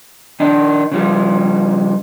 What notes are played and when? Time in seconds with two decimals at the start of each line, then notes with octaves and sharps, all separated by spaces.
0.40 D#3 D4 D#4
0.92 C#3 F3 G3